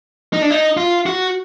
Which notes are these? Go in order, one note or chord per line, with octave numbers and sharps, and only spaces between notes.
D#4
D4
D#4
F4
F#4